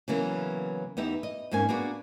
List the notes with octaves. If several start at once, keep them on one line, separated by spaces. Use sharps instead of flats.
C#3 E3 F#3 A#3 B3
E2 B3 D#4 G4 E5
D#5
F2 G#2 A#3 C#4 G#5
A#3 B3 D4 F#4 G#4